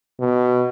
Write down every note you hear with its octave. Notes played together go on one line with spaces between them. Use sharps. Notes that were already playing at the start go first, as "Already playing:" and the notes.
B2